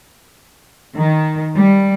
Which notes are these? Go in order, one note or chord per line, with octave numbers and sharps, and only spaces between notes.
D#3
G3